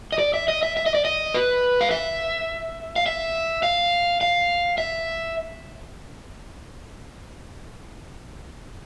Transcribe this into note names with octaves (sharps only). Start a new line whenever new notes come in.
D#5
D5
E5
D#5
E5
E5
D#5
D5
D#5
B4
F5
E5
F5
E5
F5
F5
E5